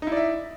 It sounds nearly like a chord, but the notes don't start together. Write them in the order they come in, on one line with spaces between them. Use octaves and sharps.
D#4 E4 D5 E5